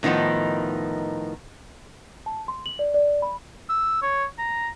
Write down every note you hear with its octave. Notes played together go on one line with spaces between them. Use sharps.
A2 D#3 F3 B3 D#4
A5
C6
F#7
D5
D5
B5
E6
C#5
A#5